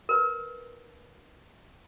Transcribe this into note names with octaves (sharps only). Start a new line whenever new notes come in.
A#4 B4